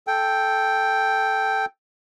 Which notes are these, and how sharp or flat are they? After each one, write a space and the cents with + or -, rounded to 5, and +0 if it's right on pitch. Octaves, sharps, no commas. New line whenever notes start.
A4 -10 G5 +0